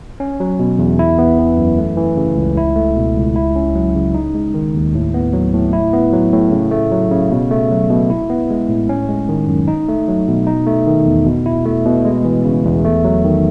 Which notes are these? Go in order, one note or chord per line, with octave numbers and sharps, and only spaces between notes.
C#4
F#3
B2
E2
E4
B3
E3
F#2
A3
E3
C#3
C#2
E4
A3
B2
C#2
E4
C#4
F#3
C#3
D#4
G#3
D#3
D#2
A2
B3
F#3
A2
E4
B3
F#3
A2
C#3
A3
F#3
C#3
B2
A3
F#3
B2
E4
B3
G#3
A2
C#4
G#3
D#3
F#2
D#4
A3
F#3
B2
D#4
A3
D#3
E2
B2
E4
A3
B2
G#3
E3
C#3
E2
A3
F#3
D#3